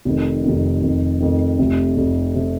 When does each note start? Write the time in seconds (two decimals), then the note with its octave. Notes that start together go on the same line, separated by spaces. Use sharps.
0.05 F1 F2 D#3
0.44 F1 F2 D#3
0.82 F1 F2 D#3
1.20 F1 F2 D#3
1.58 F1 F2 C3
1.97 F1 F2 C3
2.35 C3